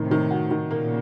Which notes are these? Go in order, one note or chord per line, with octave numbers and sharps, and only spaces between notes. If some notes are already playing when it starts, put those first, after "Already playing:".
Already playing: A2 C3 D#3
D#3
F#4
D#3
A#2 C#3 A#3